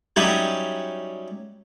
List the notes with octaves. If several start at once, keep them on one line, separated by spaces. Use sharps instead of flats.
F#3 G3 C#4 D#4 E4 G4